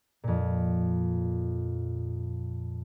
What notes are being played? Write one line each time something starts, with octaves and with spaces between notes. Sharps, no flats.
F2 A#2